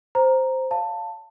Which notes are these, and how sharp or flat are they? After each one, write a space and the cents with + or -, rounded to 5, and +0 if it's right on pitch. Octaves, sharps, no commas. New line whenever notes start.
C5 +0 A#5 +0
C#5 +35 F5 +0 A5 +15